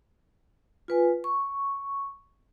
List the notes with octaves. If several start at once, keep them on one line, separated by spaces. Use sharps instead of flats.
F4 B4 G#5
C#6